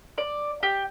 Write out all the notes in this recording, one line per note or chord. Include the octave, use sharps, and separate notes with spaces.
D5
G4